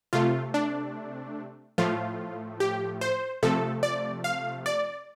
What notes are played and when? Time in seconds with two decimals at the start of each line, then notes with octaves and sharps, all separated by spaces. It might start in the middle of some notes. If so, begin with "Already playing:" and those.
0.13 C3 A3 F4
0.54 D4
1.78 A2 F3 A3 F4
2.60 G4
3.01 C5
3.43 C3 F3 A3 A4
3.83 D5
4.24 F5
4.66 D5